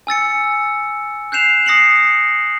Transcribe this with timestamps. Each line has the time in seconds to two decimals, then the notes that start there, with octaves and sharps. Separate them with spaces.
0.07 G#5 E6 A6 C#7
1.32 F#6 G6 C7 E7 F7
1.66 D#6 A#6 C7 C#7 F#7